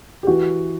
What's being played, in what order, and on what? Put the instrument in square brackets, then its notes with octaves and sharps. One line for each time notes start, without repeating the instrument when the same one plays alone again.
[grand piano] G4
E3 F#4